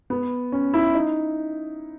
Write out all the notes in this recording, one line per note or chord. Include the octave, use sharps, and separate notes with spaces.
B3
C#4
E4
D#4